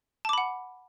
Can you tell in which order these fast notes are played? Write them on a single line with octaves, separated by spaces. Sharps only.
A5 D6 B5 F#5